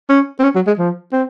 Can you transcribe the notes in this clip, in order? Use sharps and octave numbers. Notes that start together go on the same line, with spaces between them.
C#4
C4
C#4
F#3
G#3
F3
C4